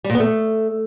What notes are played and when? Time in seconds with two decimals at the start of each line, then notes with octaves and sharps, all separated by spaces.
0.04 G3
0.10 A#2
0.15 B3
0.20 A3